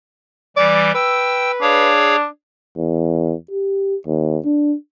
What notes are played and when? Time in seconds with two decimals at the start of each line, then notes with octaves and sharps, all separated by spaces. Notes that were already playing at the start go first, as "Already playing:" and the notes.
0.57 E3 G3 D5
0.94 B4 G5 E6
1.62 D4 G#4 C#5 F5
2.77 E2
3.51 G4
4.07 D#2
4.44 D4